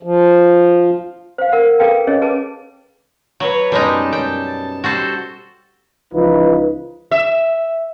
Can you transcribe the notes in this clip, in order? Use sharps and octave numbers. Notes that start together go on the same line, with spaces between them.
F3
C5 F5
A#4 F#5
G#4 A4 B4 F5 G5 A5
C#4 G#4 C#5 D#5
G#4 B4 G#5 A5 D6
F#3 B4 C#5
F#2 B2 G3 G#3 D#4 A5
F#2 G5
G3 F#4 A4 C5
C#2 E3 F3 D#4 F4 B4
E5